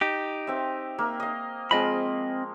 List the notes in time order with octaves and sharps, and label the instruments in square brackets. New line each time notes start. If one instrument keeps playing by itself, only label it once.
[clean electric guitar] D#4 G4
[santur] C4 E5
A#3 E5
D#5 F5
[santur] F3 G#3 [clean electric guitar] C4 D#5 B5